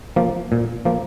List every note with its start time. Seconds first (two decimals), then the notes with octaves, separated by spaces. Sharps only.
0.16 F3 A#3
0.52 A#2
0.85 F3 A#3